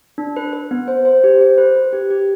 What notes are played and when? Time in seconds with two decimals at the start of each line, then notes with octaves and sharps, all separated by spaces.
0.18 D4
0.36 B4
0.53 B4
0.71 B3
0.88 C5
1.05 C5
1.24 G4
1.41 C5
1.58 B4
1.76 B4
1.93 G4
2.11 G4